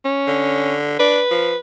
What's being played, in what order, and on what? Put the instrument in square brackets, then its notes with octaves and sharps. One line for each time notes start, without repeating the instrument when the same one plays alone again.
[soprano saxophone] C#4
[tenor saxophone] D3
[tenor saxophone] D4 [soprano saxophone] B4
[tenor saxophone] F3